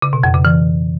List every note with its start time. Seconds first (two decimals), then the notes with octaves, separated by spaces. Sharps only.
0.02 C#3
0.13 B2
0.23 F2
0.34 C#3
0.45 E3